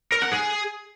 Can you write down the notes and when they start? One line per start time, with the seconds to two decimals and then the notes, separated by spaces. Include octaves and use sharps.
0.12 A#4
0.22 F#5
0.32 G#4